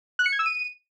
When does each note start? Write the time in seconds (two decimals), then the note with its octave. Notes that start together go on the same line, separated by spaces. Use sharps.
0.19 F#6
0.26 C#7
0.32 G#6
0.39 E6
0.46 D#7